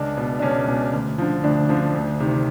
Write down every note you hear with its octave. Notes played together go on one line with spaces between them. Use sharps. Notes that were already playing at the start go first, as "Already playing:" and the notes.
Already playing: C#2 D4
B2
D4
C#2 C#4
B2
D2
D3 F3
D2 D4
D3 F3
D2
C3 D#3